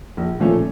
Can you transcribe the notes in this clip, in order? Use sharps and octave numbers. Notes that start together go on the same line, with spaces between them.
A#1
A#2 F3 A3 C#4